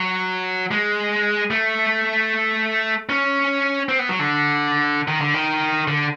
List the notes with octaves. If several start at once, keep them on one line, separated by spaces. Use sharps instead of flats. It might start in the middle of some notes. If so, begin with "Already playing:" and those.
Already playing: F#3
G#3
A3
C#4
C4
B3
F#3
D3
D#3
D3
D#3
D3